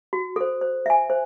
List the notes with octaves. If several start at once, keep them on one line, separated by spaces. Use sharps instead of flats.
F#4
A4 C5
C5
E5 G#5
C5